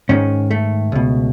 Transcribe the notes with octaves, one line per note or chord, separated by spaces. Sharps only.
G#2 D#3 C#4
A3
C#2 B2